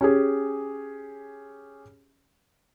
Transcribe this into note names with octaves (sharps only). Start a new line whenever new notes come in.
C#4 G4 G#4